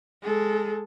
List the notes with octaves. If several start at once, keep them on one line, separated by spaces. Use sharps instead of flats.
G#3 A4